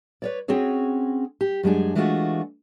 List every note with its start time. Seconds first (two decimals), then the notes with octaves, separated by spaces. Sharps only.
0.22 B4 C#5 D5
0.48 C4 C#4 F#4 G#4 C#5
1.41 G4
1.63 F#2 G#3 D4 G#4
1.95 E3 G#3 A3 D4 F4 F#4